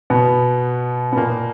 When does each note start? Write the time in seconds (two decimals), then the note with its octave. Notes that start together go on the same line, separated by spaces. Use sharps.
0.10 B2 B3
1.13 B3
1.16 A#2 A#3